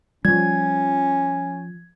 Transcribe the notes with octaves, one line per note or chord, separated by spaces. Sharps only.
F3 G3 C#4 G#6